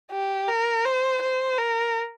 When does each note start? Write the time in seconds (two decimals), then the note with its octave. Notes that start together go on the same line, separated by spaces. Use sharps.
0.12 G4
0.48 A#4
0.85 C5
1.22 C5
1.58 A#4